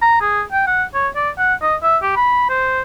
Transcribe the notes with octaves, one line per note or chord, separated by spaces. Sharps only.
A#5
G#4
G5
F#5
C#5
D5
F#5
D#5
E5
G4
B5
C5